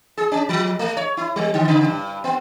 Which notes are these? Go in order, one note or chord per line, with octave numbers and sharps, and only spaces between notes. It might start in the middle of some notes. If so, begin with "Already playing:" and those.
G#4
C#4
F3
A3
C#5
E4
G3
D3
C#3
G2
B3